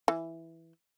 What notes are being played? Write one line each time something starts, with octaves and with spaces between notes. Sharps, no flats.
E3